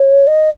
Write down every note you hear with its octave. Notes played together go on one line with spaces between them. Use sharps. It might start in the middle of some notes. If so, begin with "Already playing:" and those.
Already playing: C#5
D#5